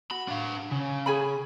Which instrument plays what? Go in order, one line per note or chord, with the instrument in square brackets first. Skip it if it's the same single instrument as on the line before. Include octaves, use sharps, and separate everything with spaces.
[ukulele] F#4 [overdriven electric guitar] B5
[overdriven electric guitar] D4 F5
C#3
[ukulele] G#4 G#5 B5